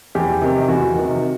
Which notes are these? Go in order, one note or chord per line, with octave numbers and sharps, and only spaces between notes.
E2 G4
C3 D#3
E2 F#4
C3 D#3